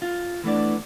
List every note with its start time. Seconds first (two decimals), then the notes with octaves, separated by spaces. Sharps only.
0.02 F4
0.44 E3 A3 B3 D4 D5